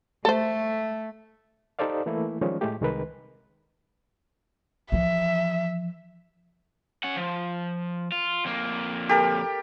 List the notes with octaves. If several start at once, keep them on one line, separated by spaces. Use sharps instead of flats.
A3 A4 C5
D#4 G4 A4 C5 D5 F5
E3 A3 A#3 E4
D#3 F3 G3 G#3 C#4
A2 G#3 A3 G4
C2 D#3 G#3 A#4 B4
E3 F3 E5
C#4 F#5
F3
F4
F2 A#3
G4 A4 A#4